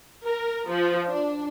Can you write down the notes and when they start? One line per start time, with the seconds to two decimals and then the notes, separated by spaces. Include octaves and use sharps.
0.24 A#4
0.70 F3
1.07 D4